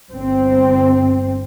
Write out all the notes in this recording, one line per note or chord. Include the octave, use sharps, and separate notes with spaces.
G1 C4